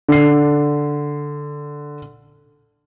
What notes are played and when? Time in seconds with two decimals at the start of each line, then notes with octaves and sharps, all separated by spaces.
0.09 D3 C7